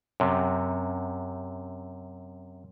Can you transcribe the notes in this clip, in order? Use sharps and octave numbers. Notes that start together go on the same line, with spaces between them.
F#2 C3